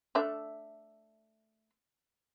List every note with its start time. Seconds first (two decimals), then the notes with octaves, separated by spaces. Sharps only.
0.15 A3 D4 E5